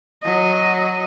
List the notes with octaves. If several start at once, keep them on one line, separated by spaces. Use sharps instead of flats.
F#3 D#5